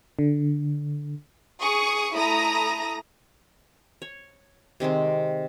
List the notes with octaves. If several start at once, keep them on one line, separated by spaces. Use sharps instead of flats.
D3
G#4 C#6 D#6
A3 E4 A#5 D#6 A#6
C#5
C3 D#3 G#3 C4